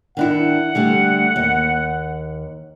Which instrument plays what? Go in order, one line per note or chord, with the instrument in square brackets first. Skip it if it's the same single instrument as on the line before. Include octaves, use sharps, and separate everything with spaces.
[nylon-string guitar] D#3 D4 E4 [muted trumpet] F#5
[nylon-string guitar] D3 G3 A3
D#2